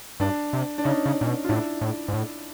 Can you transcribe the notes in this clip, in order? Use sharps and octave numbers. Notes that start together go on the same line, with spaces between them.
G2 D4
C3
D4
C#3 C#4 D#4
C#3
A#2
B2
F4
A2 D4 E4
A2
G#2
A2